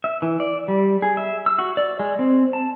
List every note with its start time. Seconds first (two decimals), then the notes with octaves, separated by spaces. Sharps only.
0.04 E5
0.22 E3
0.40 D5
0.68 G3
1.02 G#4
1.17 E5
1.46 E6
1.59 F#4
1.77 D5
1.99 G#3
2.19 C4
2.53 A5